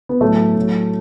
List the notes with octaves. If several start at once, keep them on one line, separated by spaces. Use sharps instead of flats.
B3
A2 F#3 A3
A2 F#3